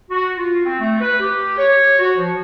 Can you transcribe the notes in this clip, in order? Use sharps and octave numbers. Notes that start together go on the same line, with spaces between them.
F#4
F4
C4
A3
B4
G4
C#5
F#4
F3